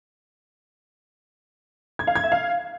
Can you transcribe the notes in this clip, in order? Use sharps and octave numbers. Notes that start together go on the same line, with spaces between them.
G#6
F5
G#6
E5
F5